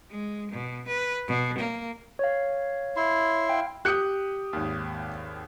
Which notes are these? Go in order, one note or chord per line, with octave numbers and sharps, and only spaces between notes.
G#3
B2
B4
B2
A#3
C#5 F5
E4 C6
F5 G5
G4 D#6 F#6 G6 C#7
G#1 D#2